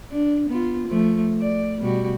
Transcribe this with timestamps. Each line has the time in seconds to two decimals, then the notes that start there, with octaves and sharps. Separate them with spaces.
0.11 D4
0.50 B3 F4
0.88 F3 A3
1.41 D5
1.80 B2 G3 F#4